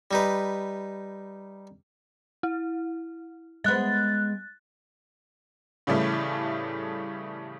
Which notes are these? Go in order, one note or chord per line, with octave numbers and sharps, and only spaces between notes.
G3 D#4 B4
E4
G#3 B3 F#6 A6
A2 C#3 E3 G3 A3